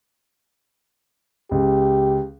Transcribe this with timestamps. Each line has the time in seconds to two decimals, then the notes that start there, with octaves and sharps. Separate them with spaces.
1.51 C#2 G4